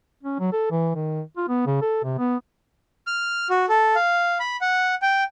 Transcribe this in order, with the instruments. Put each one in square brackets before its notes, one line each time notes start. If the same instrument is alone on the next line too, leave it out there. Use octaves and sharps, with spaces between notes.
[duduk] C#4
F#3
A4
E3
D#3
F4
B3
C#3
A4
C3
B3
[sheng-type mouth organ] F6
F#4
A4
F5
B5
F#5
G5